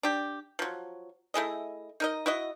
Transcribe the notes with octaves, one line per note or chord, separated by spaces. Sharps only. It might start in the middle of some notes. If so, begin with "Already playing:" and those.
D4 G4
F3 F#3
A3 E4 G#4 D#5
D#4 A#4 D#5
E4 F#4 D#5